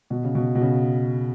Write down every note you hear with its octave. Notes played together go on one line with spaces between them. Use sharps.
B2
C#3
B2
B2
C#3